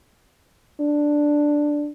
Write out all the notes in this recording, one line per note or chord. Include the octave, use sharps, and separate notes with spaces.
D4